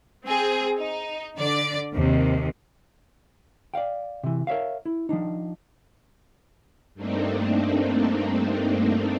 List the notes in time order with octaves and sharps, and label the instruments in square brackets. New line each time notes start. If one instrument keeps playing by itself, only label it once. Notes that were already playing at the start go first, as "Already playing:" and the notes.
[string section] C4 G#4
D#4
D3 D5
D#2 C3
[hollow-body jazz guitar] D5 D#5 F5 G5
C3 E3
A#4 C#5 E5 F5
E4
F3 A#3 D4 D#4
[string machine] G2 A3 A#3 C4 D4 D#4